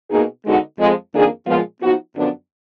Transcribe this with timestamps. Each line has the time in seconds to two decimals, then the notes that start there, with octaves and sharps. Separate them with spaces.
0.10 B2 A#3 D#4 G#4
0.45 D3 G#3 B3 D#4 F#4
0.78 F2 F3 G#3
1.13 F2 D#3 A#3 D4 G#4
1.46 A#2 F3 G#3 B3 F4
1.81 F3 B3 D#4 F#4
2.15 F#2 D3 F3 B3 D4